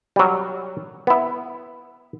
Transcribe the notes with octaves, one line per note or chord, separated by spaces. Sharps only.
F#3 G3
B3 E4